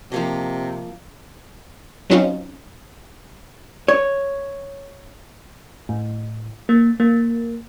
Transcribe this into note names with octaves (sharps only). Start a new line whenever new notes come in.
C3 F3 A#3 D#5
F#3 C4 C#4 D#4 F4
C#5
A2
A#3
A#3